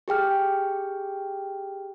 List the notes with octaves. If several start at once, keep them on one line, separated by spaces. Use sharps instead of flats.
G4 G#4 G5 F6